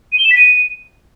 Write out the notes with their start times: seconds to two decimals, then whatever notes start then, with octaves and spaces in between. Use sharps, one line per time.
0.12 D#7
0.18 G7
0.24 E7
0.31 B6
0.37 D#7